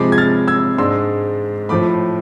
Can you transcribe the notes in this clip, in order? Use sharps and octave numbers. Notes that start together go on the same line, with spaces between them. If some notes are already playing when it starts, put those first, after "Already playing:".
Already playing: C3 F3 G#3 B5 D6
G#6
F6 A6
E6 G#6
G#2 G#3 D4 C6 E6
A2 F3 A3 B5 D6